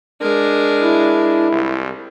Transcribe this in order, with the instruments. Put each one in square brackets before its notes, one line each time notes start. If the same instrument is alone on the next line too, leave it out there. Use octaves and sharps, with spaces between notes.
[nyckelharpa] G#3 A#4 [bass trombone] D4
[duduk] E4
[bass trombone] C2